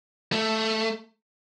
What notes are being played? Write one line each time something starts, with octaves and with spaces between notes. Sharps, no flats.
A3